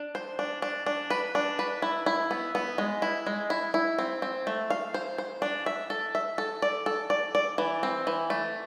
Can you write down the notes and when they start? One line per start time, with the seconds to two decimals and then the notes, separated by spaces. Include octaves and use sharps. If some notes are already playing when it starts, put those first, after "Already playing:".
Already playing: D4
0.15 C5
0.39 D4
0.62 D4
0.86 D4
1.10 B4
1.35 D4
1.59 B4
1.82 E4
2.06 E4
2.31 B3
2.55 B3
2.78 G#3
3.02 E4
3.27 G#3
3.50 E4
3.74 E4
3.99 C4
4.22 C4
4.47 A3
4.70 F5
4.94 C5
5.18 C5
5.42 D4
5.66 E5
5.90 A4
6.15 E5
6.38 A4
6.62 D5
6.86 A4
7.10 D5
7.35 D5
7.58 E3
7.83 C4
8.07 E3
8.30 A3